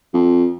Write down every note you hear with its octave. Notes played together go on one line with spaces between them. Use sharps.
F2